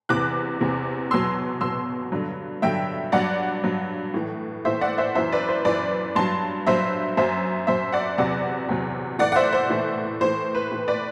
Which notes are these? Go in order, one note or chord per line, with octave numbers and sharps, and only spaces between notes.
E2 C3 E3 D6 F#6
E2 C3 E3
E2 B2 F#3 C6 E6
E2 B2 F#3 C6 E6
G2 D3 F#3
G2 D3 F#3 E5 G5
G2 F#3 D5 F#5
G2 F#3
A2 E3
A2 E3 C5 E5
D5 F#5
C5 E5
F#2 E3 C5 E5
B4 D5
C5
F#2 E3 B4 D5
G2 F#3 A5 C6
G2 F#3 C5 E5
F#2 F#3 C5 E5
F#2 F#3 C5 E5
D5 F#5
E2 C3 F#3 D5 F#5
E2 C3 F#3
A2 E3 D5 F#5
F#5
C5 E5
C5
A2 E3
A2 E3 C5
B4
A2 E3
B4 D5